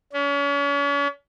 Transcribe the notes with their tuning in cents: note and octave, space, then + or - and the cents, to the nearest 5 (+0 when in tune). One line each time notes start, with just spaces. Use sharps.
C#4 +40